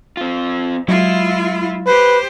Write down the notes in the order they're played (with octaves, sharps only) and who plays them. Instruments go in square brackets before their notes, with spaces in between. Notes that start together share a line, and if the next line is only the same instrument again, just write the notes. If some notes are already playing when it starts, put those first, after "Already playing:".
[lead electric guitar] C4 F4
[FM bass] F#3 [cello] G#3 F4 [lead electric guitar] E4
[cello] G4 C5 [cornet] B4